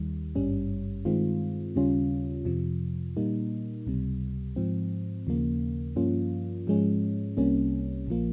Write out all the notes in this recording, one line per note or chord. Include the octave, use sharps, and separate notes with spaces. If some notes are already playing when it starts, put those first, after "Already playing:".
Already playing: D#2 D#3 G3
G#1 G2 G3 C#4
G2 D#3 G#3 C4 F4
D#2 C#3 G3 C#4 F4
F2 C3 F3
A#2 G3 A#3 D#4
C#2 C3 G3
G#2 F3 C4
D#2 C#3 F3 A#3
G2 F3 A#3 C#4 F4
G#2 F3 G#3 C#4
C2 C3 G3 A#3 C#4
A#1 F3 A#3